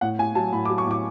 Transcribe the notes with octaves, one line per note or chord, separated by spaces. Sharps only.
A2 F#5
A2 G#5
F#3 A5
A2 B5
D6
F#3
C#6
A2 D6